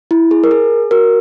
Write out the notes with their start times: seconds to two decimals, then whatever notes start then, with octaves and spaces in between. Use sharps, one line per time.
0.11 E4
0.31 G#4
0.44 A#4
0.51 G#4
0.91 F#4 A#4